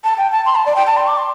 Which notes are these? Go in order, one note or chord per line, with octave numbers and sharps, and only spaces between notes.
A5
G5
A5
C6
A5
D5
G5
A5
C6
D6
C6